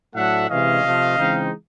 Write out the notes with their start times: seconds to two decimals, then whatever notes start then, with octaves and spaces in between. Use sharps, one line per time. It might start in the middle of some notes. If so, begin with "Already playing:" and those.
0.15 A2 F#3 A3 D4 E5 F#5
0.50 C3 E3 G#3 C#4 D#5 F5
0.84 C3 F3 A3
1.18 C#3 E3 G#3 C4 D#4